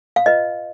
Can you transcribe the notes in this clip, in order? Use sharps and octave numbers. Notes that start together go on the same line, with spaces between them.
F5
F4 B4 D#5